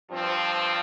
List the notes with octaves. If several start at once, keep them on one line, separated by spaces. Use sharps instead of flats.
G2 F3 C4